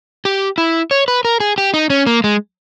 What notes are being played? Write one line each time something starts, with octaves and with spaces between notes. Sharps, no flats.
G4
E4
C#5
B4
A#4
G#4
G4
D#4
C#4
A#3
G#3